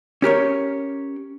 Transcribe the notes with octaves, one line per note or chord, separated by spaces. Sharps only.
C#4 G4 A#4 C#5